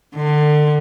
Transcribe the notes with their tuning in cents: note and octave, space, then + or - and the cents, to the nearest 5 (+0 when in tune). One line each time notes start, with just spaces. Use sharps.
D3 +30